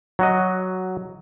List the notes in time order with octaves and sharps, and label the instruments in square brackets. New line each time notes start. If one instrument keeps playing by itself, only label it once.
[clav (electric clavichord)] F#3 F#4 D#5